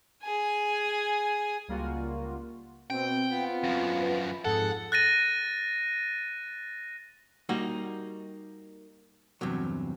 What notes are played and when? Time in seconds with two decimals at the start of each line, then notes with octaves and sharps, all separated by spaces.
0.23 G#4 G#5
1.68 C#2 G3 A#3 F4 F#4
2.90 B2 C4 G5
3.31 B3 F4
3.64 F#2 F3
4.02 B4
4.45 F2 G#2 G#4 A4 F#5
4.92 F#6 A6 A#6 D#7
7.49 G3 A#3 D#4 F#4
9.41 E2 G2 C3 F#3